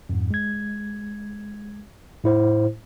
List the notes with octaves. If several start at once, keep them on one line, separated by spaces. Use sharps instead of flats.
F2 G#2
G#3 G#6
A2 E4 C5